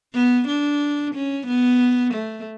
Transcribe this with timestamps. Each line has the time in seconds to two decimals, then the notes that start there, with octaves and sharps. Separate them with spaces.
0.13 B3
0.48 D4
1.14 C#4
1.47 B3
2.13 A3